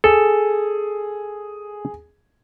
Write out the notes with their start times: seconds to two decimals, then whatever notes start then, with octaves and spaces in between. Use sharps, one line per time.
0.04 G#4 A4